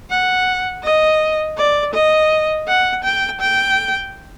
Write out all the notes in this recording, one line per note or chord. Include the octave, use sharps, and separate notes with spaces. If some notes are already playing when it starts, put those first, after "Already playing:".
F#5
D#5
D5
D#5
F#5
G5
G5